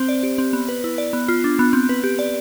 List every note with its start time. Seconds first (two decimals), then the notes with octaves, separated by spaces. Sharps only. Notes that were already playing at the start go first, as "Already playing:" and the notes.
Already playing: C4 C5
0.09 D5
0.23 G4
0.38 C4
0.53 B3
0.69 B4
0.84 E4
0.98 D5
1.13 B3
1.28 F4
1.44 D4
1.59 B3
1.73 C4
1.89 B4
2.04 G4
2.19 D5